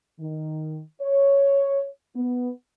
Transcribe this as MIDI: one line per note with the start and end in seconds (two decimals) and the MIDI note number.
0.19 0.82 51
1.01 1.87 73
2.16 2.51 59